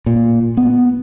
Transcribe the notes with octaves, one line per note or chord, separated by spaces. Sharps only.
A#2
B3